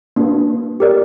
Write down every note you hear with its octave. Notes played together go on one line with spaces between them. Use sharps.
A#3 D4 F#4 B4
G4 A#4 D5